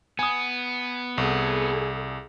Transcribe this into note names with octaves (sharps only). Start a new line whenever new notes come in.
B3 G#5 D#6
C2 G#4 A4